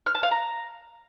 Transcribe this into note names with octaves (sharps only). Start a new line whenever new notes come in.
F6
A5
F5
A#5